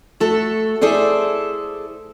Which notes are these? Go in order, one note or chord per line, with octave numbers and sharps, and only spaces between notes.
A3 F#4 A4
E4 G#4 A4 C5 D5